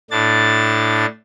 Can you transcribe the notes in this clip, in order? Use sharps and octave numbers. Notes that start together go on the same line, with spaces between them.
A2 D4 A6